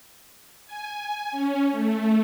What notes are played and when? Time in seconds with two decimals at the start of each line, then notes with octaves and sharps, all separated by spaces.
0.66 G#5
1.32 C#4
1.72 A3